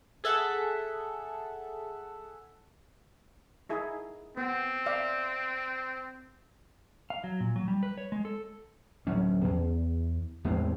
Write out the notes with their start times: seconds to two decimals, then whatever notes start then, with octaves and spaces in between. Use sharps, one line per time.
0.24 G#4 A4 E5 F#5
3.69 D#4 E4 G#4
4.37 B3 C4
4.86 D5 E5 F5
7.10 F5
7.24 F#3
7.40 A#2
7.56 F#3
7.68 G3
7.83 B4
7.98 C#5
8.12 G#3
8.25 A4
9.07 D1 F#3 C#4
9.44 E2
10.45 E2 A2 G#3 C4